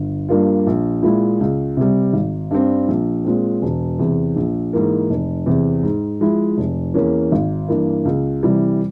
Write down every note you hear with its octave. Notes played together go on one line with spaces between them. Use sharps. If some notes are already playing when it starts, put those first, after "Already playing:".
Already playing: G1
G2 G3 A#3 F4
A#1
A#2 G#3 E4
C#2
C3 G3
G#1
G2 G3 C4
A#1
A#2 G#3 C4
E1
E2 C3
A#1
G#2 E3 A#3
F1
E2 C3
G#2
F3 G#3 E4
F1
E2 E3 A#3 C#4
G#1
G2 E3 A#3
C#2
C3 E3 G3